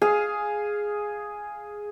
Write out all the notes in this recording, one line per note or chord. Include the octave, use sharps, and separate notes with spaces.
G#4 F5